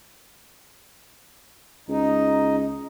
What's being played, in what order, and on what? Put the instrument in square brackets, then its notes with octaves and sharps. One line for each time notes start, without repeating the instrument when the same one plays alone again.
[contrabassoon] C#2 [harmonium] D#4